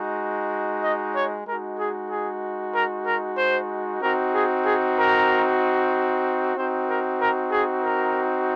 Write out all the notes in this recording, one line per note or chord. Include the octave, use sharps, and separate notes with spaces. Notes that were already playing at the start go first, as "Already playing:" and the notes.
Already playing: G#3 D#4 F#4
D#5
C#5
G#3 D#4 F#4 A#4
G#4
G#4
A#4
A#4
C5
C4 D#4 F#4 A#4
G#4
G#4
A#4
C4 D#4 F#4 C5
A#4
A#4
G#4
A#4